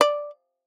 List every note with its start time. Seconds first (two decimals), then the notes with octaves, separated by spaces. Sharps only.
0.01 D5